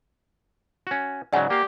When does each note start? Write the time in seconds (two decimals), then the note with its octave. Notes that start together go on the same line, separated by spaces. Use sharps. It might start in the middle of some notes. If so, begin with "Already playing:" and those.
0.87 C#4 F#4
1.33 G#2 C#3 F#3 D5 F#5 G#5
1.50 A#3 G4 F5